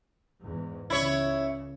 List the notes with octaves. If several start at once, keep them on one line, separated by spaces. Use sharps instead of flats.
E2 G#2
C#2 C#3 E4 C#5